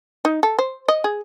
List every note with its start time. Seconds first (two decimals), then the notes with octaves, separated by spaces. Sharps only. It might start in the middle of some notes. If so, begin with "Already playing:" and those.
0.25 D#4
0.43 A4
0.59 C5
0.88 D#5
1.04 G#4